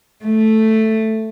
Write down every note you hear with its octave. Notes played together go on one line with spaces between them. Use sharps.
A3